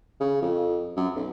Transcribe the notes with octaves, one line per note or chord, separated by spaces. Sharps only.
C#3
F2
F#2
B1